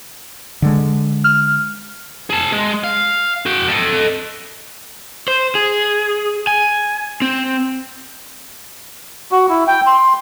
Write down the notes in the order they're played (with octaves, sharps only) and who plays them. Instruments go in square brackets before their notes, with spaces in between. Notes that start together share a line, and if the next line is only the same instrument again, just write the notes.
[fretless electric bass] D3 G#3
[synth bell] F6
[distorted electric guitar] G#4 A5
G#3
F5
F#4 G5
A4 D#5
[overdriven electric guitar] C5
G#4
G#5
C4
[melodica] F#4
E4
G5
C6